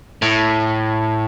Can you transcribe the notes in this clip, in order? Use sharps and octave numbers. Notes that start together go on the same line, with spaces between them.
A2